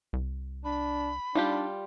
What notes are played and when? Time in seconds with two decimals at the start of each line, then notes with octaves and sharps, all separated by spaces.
0.13 C2
0.65 D4 B5
1.35 G3 D4 D#4 F4 G4